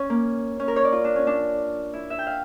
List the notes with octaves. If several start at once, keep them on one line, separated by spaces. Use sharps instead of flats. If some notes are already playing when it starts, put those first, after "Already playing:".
Already playing: C#4
A#3
C#4
A#4
C#5
D5
F4
D4
C#4
D4
E4
E5
G5
F5